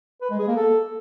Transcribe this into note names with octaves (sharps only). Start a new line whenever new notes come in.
B4
G#3
G#4
A#3
A4